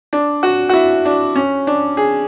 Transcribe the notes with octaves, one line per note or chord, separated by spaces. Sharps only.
D4
F#4
F#4
E4
D4
C#4
D4
G#4